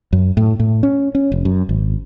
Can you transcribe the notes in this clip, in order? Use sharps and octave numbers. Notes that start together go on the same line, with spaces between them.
F#2
A2
A2
C#4
C#4
F1
F#2
G#1